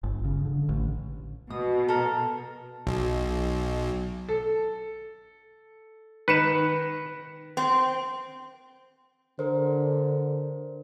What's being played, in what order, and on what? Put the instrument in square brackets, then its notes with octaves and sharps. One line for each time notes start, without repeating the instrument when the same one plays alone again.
[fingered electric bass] G1
C#3
D3
A1
[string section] B2 [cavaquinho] D#6
[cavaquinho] A4 A#4
[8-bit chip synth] B1
[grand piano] A4
[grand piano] D#3 C#7 E7 [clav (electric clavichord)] B4
[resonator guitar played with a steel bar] C4
[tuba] D3 [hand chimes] A#4 C5